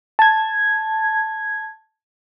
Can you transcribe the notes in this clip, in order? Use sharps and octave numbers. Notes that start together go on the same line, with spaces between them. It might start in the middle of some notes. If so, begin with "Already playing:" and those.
A5 G#6